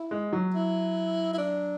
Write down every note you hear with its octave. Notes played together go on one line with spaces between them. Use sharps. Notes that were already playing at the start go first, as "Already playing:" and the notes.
Already playing: E4
G#3
F#3
E4
E4
D4